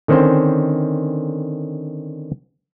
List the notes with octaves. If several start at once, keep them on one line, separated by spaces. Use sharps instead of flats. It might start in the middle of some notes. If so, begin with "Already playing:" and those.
D3 D#3 C4 C#4 C5